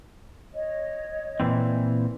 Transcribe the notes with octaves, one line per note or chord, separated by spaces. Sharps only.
C#5 D#5
A#2 E3 C4